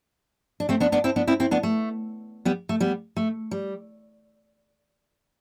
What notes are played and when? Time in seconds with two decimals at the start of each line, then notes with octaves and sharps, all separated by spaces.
0.60 D4
0.69 A3 C4
0.80 B3 D4
0.92 B3 D4
1.04 C4 E4
1.16 B3 D4
1.27 C4 E4
1.40 C4 E4
1.51 B3 D4
1.63 A3
2.45 G3 B3
2.69 A3
2.80 G3 B3
3.17 A3
3.51 G3